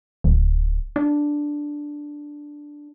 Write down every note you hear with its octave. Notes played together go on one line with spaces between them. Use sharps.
D1
D4